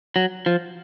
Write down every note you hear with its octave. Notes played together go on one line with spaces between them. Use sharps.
F#3
F3